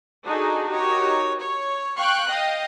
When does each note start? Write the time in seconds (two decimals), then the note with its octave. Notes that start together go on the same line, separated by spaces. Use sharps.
0.25 D4 D#4 F#4 G#4 A4
0.68 D#4 F#4 G4 A#4 C#5
1.39 C#5
1.97 F5 G5 C#6 F#6
2.28 D#5 F5 G5